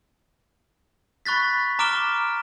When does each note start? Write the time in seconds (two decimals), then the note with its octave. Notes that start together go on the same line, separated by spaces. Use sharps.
1.26 B5 C#6 F#6 A6 B6
1.79 A#5 D6 F6 D7 E7 G7